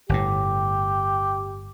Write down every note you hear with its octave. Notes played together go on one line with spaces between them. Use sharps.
G1 A2 G4